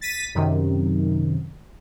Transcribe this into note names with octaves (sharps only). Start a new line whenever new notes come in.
A6 B6 D#7
F#2 C3 D#3